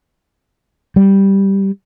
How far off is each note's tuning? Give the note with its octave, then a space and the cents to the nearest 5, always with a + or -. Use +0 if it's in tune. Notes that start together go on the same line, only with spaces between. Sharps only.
G3 -5